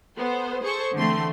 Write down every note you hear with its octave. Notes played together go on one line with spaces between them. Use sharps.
B3 A4 C5
G#4 A4 C5 C#6
D3 E3 A3 C4 C6